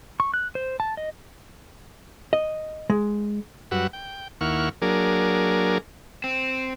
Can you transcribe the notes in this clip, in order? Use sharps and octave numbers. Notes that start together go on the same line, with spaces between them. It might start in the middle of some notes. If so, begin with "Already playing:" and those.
C#6
F#6
C5
A5
D#5
D#5
G#3
F#2 G3 F#4 B4 F#5 E6
G5
D#2 A#3 E4 F#5 C#6 F6
F#3 A#3 D4 G#4 A#4
C4